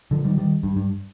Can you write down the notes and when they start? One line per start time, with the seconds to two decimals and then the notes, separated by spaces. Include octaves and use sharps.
0.11 D3 F3
0.25 D#3 G3
0.38 D#3 G3
0.63 G2
0.76 G2